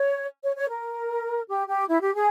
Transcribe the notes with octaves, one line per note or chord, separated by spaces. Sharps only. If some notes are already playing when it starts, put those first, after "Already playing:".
Already playing: C#5
C#5
C#5
A#4
G4
G4
E4
G4
G#4